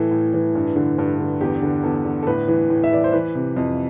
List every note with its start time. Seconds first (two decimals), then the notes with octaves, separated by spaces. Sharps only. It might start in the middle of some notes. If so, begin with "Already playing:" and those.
Already playing: A2 E3 A4
0.11 A2
0.34 E3
0.55 G2
0.76 D3
0.98 G2
1.19 D3
1.41 E2 G4
1.62 D3
1.84 E2 A4
2.05 D3
2.23 A4
2.27 A2 B4
2.48 E3
2.70 A2
2.84 E5
2.92 E3 D5
3.04 C5
3.13 E3 B4
3.35 C3
3.56 F2